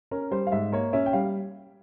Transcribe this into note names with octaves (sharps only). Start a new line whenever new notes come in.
C#4 A#4
G3 C5
F5
G#2 E5
A#3 C#5
C#4 E5
G5
G3 F5